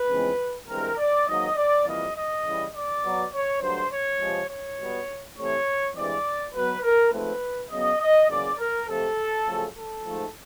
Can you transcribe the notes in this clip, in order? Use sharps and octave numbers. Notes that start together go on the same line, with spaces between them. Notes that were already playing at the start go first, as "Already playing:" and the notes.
Already playing: B4
E2 C#3 F3 G#3 C4
G2 E3 G#3 C4 A#4
D5
G#2 D#3 F#3 A#3 D#5
D5
F2 C3 E3 G3 A#3 D#5
D#5
C#3 E3 G3
D5
B2 F#3 B3
C#5
G2 D3 F#3 A3 C5
C#5
C3 F3 G#3
C#5
B2 G3 B3
C3 E3 A3 C4 C#5
G2 E3 G#3 C4 D5
B2 F#3 B3 B4
A#4
G#2 F3 A3 C4 B4
C#3 F#3 B3 D#5
D#5
E2 C#3 F#3 A#3 D5
A#4
F2 C3 F3 A3 A4
F#2 C#3 F3 A3
A4
G#2 F3 A3